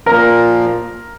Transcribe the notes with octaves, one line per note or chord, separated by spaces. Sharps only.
A#2 F3 A#3 A#4 A#5